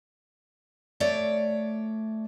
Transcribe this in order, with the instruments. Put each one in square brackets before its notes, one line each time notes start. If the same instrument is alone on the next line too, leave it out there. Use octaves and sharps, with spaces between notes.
[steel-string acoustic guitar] A3 C#5 D5